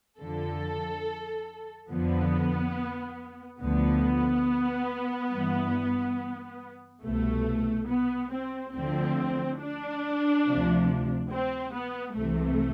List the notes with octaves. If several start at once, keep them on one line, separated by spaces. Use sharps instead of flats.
F2 D3 F3 A4
F2 D3 F3 B3
D2 D3 F3 B3
G2 E3
C2 B2 A3
B3
C4
D2 D3 F3 C4
D4
D2 C3 F3
C4
B3
C2 C3 E3 A3